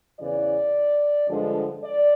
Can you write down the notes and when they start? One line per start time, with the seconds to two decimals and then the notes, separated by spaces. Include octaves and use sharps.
0.18 E2 C#3 E3 D5
1.28 G2 D3 F3 G#3
1.83 D5